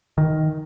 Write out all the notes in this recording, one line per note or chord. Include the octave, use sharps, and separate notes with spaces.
D#3